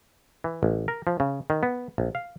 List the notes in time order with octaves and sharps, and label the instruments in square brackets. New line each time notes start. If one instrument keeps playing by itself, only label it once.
[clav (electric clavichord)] E3
A1
A#4
F3
C#3
D#3
B3
A#1
F5